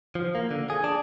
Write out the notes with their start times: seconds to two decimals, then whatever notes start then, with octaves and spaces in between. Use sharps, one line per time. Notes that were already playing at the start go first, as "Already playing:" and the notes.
0.15 F3
0.35 A#3
0.51 D3
0.70 G#4
0.84 D4